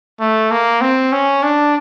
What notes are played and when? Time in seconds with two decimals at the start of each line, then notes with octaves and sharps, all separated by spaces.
0.20 A3
0.51 A#3
0.81 C4
1.12 C#4
1.43 D4